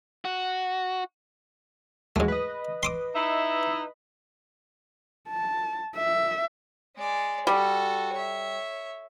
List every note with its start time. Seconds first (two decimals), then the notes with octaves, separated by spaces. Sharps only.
0.25 F#4
2.16 D#2 G#2 F#3 G#3 A3
2.28 B4 D#5
2.83 C6 D6 D#6
3.14 D#4 E4 E5
5.29 A5
5.96 E5
6.96 G#3 D5
7.47 G3 F#4 A4
8.13 C#5 E5